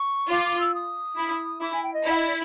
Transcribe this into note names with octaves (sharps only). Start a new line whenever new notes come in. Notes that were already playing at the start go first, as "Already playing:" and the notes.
Already playing: C#6
F4 D6
D6
E6
D#6
E4
E4 D6
G#5
G5
D#5
E4
F#5
D#5
D5